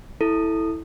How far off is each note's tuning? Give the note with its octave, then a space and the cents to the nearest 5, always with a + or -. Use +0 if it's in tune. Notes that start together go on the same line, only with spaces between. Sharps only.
E4 -15 A4 +0